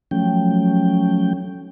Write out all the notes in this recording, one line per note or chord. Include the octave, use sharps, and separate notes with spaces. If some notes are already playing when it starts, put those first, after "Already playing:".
F3 F#3 A3 C#4 G5